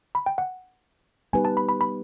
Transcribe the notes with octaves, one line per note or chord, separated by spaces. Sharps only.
B5
G5
F#5
G3 B3 D#4 G4 B4 G#5
A5
B5
B5
B5